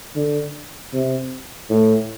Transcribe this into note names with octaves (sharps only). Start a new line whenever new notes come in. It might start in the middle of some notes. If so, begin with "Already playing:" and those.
D3
C3
A2